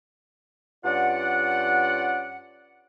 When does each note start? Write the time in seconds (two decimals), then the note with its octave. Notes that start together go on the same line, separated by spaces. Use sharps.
0.85 G2 C#4 F4 D5 F#5